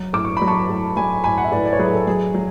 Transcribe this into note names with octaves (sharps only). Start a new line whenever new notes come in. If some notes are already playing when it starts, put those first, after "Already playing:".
Already playing: F#3
A2 D6
C#6
F#3 B5
A5 C#6
A2
F#3 G#5 B5
A2 G#5 B5
F#5
E5
A2 B4 D5
D5
C#5
F#3 G#4 B4
A4
F#3 G#4
F#3